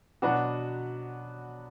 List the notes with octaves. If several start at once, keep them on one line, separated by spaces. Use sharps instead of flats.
B2 F#3 B3 D4 F#4